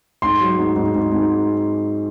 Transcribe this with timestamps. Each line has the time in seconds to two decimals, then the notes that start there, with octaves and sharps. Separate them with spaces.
0.22 G#2 C6
0.41 F#3
0.58 G#2
0.76 G#2
0.95 G#2
1.12 G#2